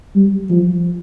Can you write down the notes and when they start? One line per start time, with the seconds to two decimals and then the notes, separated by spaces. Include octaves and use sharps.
0.15 G3
0.50 F3